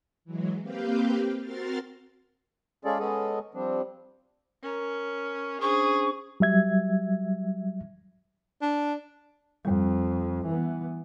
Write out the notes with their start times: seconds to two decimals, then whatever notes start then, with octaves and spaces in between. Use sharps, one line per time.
0.25 E3 F#3 G#3
0.60 A#3 C4 G4 B4 F5 G5
1.40 C4 F#4 A#4 C6 F6 A6
2.85 G#3 C#4 F4 G#4 A4 D5
2.99 G#3 B3 C#4 G#4 A4 D#5
3.54 F3 G3 C4 D4
4.63 C#4 A#4 A#5
5.62 C#4 D4 G#4 C5 C#6
6.40 F#3 G3 E5 G#6
8.62 D4
9.65 F2 G3 C4
10.46 E3 B3